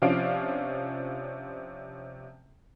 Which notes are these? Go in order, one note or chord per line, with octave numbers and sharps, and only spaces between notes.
C3 F3 C#4 D4 F5 D7